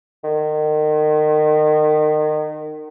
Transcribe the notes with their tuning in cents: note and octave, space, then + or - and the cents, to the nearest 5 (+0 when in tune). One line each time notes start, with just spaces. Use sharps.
D#3 -30